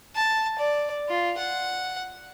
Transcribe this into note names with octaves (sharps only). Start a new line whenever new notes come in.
A5
D5
F4
F#5